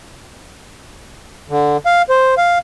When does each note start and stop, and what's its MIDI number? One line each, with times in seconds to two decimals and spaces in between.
1.49 1.77 50
1.86 2.02 77
2.10 2.34 72
2.38 2.58 77